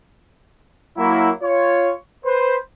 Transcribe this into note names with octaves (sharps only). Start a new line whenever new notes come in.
F#3 A#3 E4
F4 C#5
B4 C5